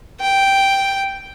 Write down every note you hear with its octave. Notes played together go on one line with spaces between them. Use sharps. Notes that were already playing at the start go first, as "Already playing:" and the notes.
G5